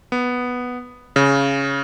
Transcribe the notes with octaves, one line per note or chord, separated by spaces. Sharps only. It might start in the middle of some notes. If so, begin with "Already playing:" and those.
B3
C#3